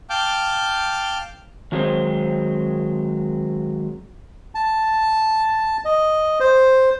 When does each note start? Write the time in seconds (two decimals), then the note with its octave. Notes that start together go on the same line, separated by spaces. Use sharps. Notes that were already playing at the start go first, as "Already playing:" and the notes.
0.10 F5 G5 A5 D6 F6 G6
1.72 D#3 F#3 G#3 C4 C5
4.55 A5
5.85 D#5
6.40 C5